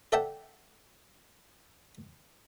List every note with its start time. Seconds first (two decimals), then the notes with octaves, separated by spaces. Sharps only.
0.12 A4 D5 E5 F#5 G5 A5